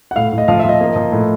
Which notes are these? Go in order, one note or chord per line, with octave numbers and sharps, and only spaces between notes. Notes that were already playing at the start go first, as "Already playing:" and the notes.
F#5
A2 F5
A2
D#5
F3 F5
E5
F3 D#5
A#3
F3
A2